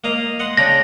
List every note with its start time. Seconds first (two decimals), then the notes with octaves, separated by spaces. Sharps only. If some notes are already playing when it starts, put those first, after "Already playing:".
0.04 A#3 D#5 F5
0.39 D#5 F#5 C6
0.57 C#3 D4 G5 A#6